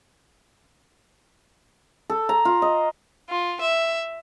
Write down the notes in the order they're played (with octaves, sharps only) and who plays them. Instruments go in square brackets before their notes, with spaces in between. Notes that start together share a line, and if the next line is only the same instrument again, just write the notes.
[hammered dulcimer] A4
A#5
F4
D#5
[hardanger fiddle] F4
E5